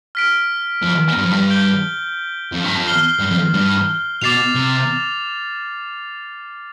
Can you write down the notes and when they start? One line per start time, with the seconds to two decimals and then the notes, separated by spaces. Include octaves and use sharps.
0.15 F6 B6 D7
0.83 F2
1.17 G2
1.24 F2
1.31 G2
1.50 G6 D7 G7
2.52 F2
2.64 G2
2.76 F2
2.87 F6 C7 G7
3.20 G2
3.31 F2
3.54 G2
4.21 B2 D6 A6 C7 F7
4.55 C3